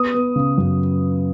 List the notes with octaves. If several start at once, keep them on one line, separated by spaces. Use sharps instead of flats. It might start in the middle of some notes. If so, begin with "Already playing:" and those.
Already playing: B3 D#6
B3
C#3
F#2